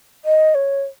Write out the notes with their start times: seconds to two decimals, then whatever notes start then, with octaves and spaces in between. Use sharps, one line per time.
0.25 D#5
0.55 C#5